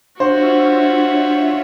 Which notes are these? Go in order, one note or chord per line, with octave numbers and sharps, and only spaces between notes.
D4 F4 F#4 C5 C#5 E5